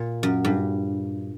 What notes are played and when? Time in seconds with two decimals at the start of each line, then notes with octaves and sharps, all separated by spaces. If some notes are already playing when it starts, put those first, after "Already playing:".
Already playing: A#2
0.23 F#2
0.45 G2